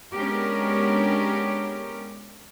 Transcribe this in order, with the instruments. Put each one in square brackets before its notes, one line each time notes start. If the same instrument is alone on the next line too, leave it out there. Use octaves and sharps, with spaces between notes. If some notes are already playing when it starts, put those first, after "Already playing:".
[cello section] G#3 B3 C#4 D4 G4 A#4